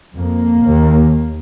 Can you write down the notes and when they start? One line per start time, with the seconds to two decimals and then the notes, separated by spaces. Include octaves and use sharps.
0.16 F2 A#3
0.64 D#2